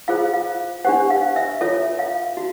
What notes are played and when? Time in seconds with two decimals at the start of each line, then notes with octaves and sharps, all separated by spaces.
0.08 F4 G#4 C5 F5
0.34 F5
0.85 D4 G4 C5 F#5
1.10 F5
1.36 E5
1.61 F4 A4 C#5 E5
1.99 F5
2.37 F#4